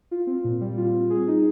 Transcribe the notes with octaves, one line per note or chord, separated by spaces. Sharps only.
F4
C4
A#2
G3
F4
C4
G#4
D#4